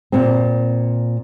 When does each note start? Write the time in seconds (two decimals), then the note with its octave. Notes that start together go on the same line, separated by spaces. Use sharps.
0.12 A#2 C4